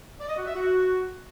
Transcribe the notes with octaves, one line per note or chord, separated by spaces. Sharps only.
D5
D#5
F#4
E5
F#4